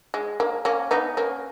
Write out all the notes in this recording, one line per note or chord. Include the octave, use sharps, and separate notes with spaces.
G#3
A#3
A#3 C#4
B3 D#4
A#3 C#4